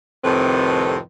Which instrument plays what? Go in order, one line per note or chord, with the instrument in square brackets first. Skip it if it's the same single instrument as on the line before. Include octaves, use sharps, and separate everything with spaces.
[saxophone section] F2 A2 C3 D#3 C4 B4